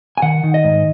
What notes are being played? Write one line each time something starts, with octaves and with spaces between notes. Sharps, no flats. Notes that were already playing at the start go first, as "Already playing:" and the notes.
G#5
D#3 F#5
D#3
D#5
G#2